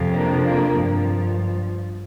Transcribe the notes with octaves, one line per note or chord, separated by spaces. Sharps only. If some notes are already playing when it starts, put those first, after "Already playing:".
Already playing: F2 C3 F3
A#3 D4
A#3 D4
G2 F3